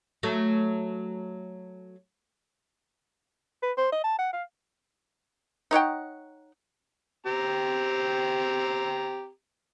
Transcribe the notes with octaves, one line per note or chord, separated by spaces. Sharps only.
F#3 A3
B4
C5
D#5
A5
F#5
F5
D#4 C#5 F#5 G5
C4 G4 A#5